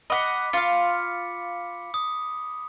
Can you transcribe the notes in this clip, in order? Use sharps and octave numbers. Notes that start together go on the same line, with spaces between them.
D#5 F#5 B5 D6 B6
F4 F5 C#7
D#6